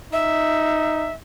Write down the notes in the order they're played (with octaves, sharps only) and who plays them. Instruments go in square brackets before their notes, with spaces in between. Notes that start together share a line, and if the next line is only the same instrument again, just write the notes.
[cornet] D#4 [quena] E5